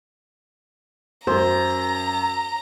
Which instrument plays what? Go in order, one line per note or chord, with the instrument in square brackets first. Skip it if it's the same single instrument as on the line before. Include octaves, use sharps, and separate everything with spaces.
[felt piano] F#2 [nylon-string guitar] C5 [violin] A#5